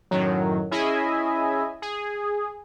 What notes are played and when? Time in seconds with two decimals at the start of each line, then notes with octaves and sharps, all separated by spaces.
0.11 F#2 A2 D#3 F#3
0.71 C#4 E4 G#4 D#5 E5 G#5
1.82 G#4